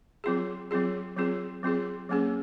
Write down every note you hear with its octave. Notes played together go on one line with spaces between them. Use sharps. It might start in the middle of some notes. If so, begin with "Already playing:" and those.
F#3 C4 F4 G#4
F#3 C4 F4 G#4
F#3 C4 F4 G#4
F#3 C4 F4 G#4
F#3 A#3 C#4 G#4